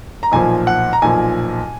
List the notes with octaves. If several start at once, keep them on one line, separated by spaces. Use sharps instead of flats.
A#5
B1 A#2 F3 G#5
F#5
A#5
B1 A#2 F3 G#5